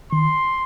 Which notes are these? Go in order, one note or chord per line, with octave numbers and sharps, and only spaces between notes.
D#3 C6